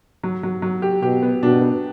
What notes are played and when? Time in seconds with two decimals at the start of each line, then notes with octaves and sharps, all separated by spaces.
0.23 F#3
0.43 F#3
0.62 F#3
0.82 G4
1.02 B2 G4
1.22 B3
1.42 B2 D4
1.61 B3